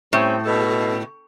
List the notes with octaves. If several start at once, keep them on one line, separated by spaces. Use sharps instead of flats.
A2 G3 C4 C#4
B2 G#3 A4